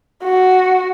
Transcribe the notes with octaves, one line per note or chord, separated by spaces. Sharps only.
F#4